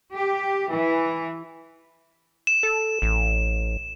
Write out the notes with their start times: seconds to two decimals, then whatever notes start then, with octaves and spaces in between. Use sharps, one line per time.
0.14 G4
0.70 E3
2.47 E7
2.63 A4
3.02 A1